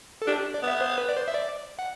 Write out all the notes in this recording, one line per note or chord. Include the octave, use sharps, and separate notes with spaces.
A4
D4 G4
D5
B3
E5
C5
B4
D5
C5
E5
D5
F#5